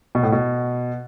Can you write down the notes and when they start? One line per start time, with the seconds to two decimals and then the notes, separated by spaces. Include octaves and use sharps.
0.15 B2
0.23 A2
0.32 B2